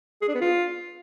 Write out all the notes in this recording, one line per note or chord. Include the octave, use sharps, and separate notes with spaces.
G#4
D4
B3
F4